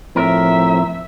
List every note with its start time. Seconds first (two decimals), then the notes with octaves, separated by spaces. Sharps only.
0.16 A2 F3 C4 A#4 E5